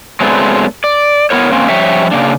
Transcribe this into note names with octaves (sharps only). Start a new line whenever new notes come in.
F#3 G#3 A3 B3 C4 D4
D5
B3 C4 E4 A#4 C#5
A#3 C4 C#4
F3 G3 C#4 G4 C#5 E5
C#3 A#3 D4